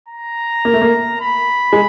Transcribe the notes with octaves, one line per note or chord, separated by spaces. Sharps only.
A#5
A#3
A3
A#3
B5
G#3